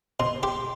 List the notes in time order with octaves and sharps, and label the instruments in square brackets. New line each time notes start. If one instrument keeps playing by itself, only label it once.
[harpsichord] B2 [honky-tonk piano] C6
[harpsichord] G4 [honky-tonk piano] C6